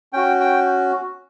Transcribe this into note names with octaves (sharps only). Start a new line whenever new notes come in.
C#4 F#4 G5
G5